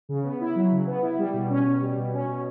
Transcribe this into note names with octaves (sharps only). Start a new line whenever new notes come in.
C#3
B3
E4
F#3
C#3
B3
E4
G3
B2
C#4
B2
G3
B2
C#4
B2